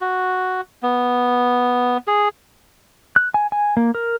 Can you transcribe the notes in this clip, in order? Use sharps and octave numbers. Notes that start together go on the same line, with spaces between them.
F#4
B3
G#4
F#6
G#5
G#5
A#3
A#4